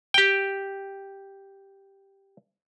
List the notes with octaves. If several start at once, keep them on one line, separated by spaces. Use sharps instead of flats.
G4 G5